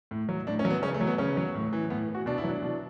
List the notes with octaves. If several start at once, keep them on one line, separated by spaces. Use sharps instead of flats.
A2
F#3
A2 D4
C#4
F#3
B3
C#3 C#4
A3
F#3
B3
C#3 C#4
F#3
A2
E3
A2 B3
E3
F#4
B2 D4
E4
F#3 D4
B2